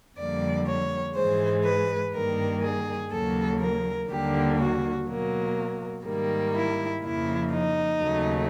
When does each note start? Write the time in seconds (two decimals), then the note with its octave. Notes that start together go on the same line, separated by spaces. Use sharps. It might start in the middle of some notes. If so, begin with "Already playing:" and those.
0.18 F2 D3 G3 A#3 D5
0.67 C#5
1.15 G#2 E3 G#3 C5
1.65 B4
2.13 G2 D#3 G3 A#3 A#4
2.62 G#4
3.11 D#2 C#3 F#3 A#3 A4
3.61 A#4
4.09 D#2 D3 G3 A#3 G4
4.58 F#4
5.07 B2 F#3 A#3
6.06 G#2 D#3 G3 A#3
6.55 E4
7.03 F2 C#3 F3 A#3 E4
7.53 D#4
8.01 D#2 C#3 F#3 A3